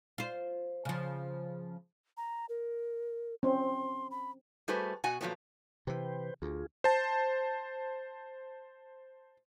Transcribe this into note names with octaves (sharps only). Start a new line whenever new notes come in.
F4 C5
C#3 F3
A#5
A#4
C4 C#4 C6
B5
G3 A3 F#4 G#4 B4 C5
B2 F#4 F#5 G#5
A#2 F3 F#3 A3 B3
C3 E3 B4 C5 G5
D2 F4 G#4
C5 A5